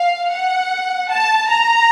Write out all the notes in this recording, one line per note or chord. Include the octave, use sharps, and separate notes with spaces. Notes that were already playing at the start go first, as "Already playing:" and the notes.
Already playing: F5
F#5
A5
A#5